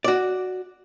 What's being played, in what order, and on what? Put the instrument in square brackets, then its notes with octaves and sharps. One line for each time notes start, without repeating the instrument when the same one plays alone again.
[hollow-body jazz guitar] F#4 D5